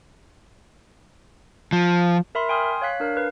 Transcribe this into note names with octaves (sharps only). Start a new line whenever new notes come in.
F3
A#4 E5 B5 C6
G5 G#5 C6 D#6 F6
C#5 F5 F#6 B6
D4 A#4 F5
B4